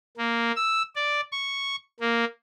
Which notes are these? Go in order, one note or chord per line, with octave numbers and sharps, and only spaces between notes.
A#3
E6
D5
C#6
A#3